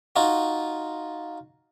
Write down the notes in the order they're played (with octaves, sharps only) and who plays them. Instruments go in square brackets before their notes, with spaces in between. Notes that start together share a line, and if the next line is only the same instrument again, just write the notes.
[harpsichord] D#4 F4 F#4